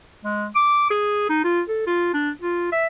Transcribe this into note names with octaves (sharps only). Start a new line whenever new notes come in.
G#3
D6
G#4
D#4
F4
A4
F4
D4
F4
E5